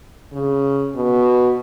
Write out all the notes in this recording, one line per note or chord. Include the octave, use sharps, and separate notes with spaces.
C#3
B2